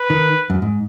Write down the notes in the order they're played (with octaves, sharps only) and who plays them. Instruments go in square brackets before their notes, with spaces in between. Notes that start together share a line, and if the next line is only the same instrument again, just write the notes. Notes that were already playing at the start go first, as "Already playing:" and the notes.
Already playing: [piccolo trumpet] B4
[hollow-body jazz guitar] D#3
F#2
G#2